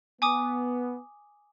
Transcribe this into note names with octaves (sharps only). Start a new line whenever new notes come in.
B3 G#5 D6 D#6